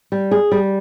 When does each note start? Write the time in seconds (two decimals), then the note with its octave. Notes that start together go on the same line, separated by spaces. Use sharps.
0.12 G3
0.31 G#4
0.52 G3